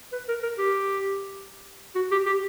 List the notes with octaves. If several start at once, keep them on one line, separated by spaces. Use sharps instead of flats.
B4
A#4
A#4
G4
F#4
G4
G4